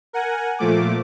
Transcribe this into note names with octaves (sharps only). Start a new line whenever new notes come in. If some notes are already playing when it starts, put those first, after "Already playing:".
A#4 F#5 G#5
A#2 F3 A3 D6